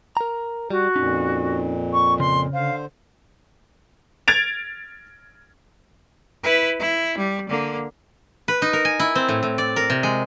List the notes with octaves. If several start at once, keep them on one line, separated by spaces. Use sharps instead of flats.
A#4 A#5
G3 F#4
F2 A#2 C#4 D#4
C#6
C#3 C6
D3 C5 F5
G#6 A6 D7 F7
E4 B4
E4
G3
D3 A#3
B4
D#4
A#4
G#5
E4
C4
A2
A2
D5
A#4
C3
G#3